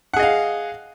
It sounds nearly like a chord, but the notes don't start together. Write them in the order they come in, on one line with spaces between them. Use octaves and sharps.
F#5 G#4 D#5 F5